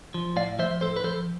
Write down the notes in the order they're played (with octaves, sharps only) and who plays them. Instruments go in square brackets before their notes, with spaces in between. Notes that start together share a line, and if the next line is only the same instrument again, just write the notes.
[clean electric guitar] F3
A2 D5 F5
F3 C5 E5
A2 A4 C5
B4
F3 A4 C5